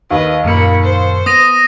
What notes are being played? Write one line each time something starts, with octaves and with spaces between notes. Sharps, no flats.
D#2 B4 D#5
F#2 A#2 A#3 B5 C#7
C5
B3 D#6 A#6 D#7